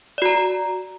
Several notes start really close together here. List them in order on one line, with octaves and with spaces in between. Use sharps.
D5 F#4 A#5